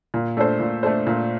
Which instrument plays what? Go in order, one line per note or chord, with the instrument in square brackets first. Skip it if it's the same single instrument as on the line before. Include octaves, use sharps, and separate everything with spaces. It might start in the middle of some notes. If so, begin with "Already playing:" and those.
[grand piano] A#2
A3 D4 A4 C5
A#2
A3 D4 A4 C5
A#2